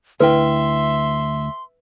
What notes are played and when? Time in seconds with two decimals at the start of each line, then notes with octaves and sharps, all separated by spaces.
0.20 D2 E4 B4 E5 G5 C6